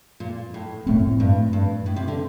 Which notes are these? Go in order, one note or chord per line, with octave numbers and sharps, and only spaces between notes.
A#2
A2
F#2 A2 A3 C4
G2
G2
A2
C3
D3